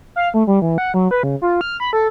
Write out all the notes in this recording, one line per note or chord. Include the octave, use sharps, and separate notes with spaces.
F5
A3
G3
E3
F#5
F#3
B4
C#3
F4
F6
B5
A4